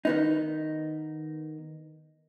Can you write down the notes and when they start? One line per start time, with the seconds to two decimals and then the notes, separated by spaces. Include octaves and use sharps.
0.05 D#3 B3 D#4